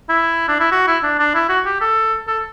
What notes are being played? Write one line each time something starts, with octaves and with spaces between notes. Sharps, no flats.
E4
D4
E4
F#4
E4
D4
D4
E4
F#4
G4
A4
A4